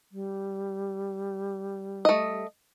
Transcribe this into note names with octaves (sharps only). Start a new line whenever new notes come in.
G3
A3 D#5